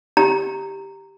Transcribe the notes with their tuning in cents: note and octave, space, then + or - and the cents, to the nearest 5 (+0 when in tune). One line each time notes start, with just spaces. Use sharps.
G4 +0 A#5 -10